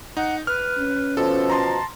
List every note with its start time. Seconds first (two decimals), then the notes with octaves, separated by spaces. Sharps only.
0.17 D#4 F#5
0.47 B4 F6
0.78 C#4
1.17 B2 F3 A4
1.50 A5 A#5 C6